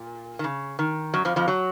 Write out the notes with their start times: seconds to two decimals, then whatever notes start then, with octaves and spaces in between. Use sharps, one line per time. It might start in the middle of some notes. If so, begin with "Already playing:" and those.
Already playing: A#2
0.39 D#3
0.44 C#3
0.79 D#3
1.14 F#2 F#3
1.25 F2 F3
1.36 F2 F3
1.48 F#3